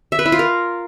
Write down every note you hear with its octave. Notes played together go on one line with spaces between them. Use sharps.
E5
B4
E4
F4
A#4